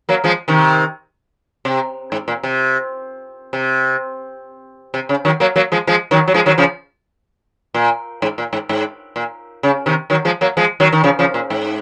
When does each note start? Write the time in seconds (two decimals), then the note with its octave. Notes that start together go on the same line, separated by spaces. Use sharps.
0.09 F#3 A#3
0.24 F3 G#3
0.48 C3 D#3
1.65 C3
2.12 G#2
2.28 A#2
2.43 C3
3.53 C3
4.94 C3
5.09 C#3
5.25 D#3 F#3
5.40 F#3 A#3
5.56 F#3 A#3
5.72 F3 G#3
5.87 F3 G#3
6.11 D#3 F#3
6.27 F#3
6.34 F3 G#3
6.46 D#3 F#3
6.58 C#3 F3
7.74 A#2
8.22 G#2
8.38 A#2
8.53 G#2
8.69 G#2
9.16 A#2
9.63 C#3
9.86 C3 D#3
10.10 D#3 F#3
10.25 F3 G#3
10.41 F#3 A#3
10.57 F3 G#3
10.80 D#3 F#3
10.92 D#3
11.04 C#3 F3
11.19 C#3 F3
11.34 A#2
11.50 G#2